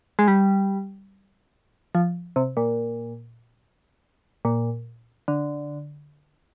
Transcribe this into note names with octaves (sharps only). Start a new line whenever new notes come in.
G#3
G3
F3
C3
A#2
A#2
D3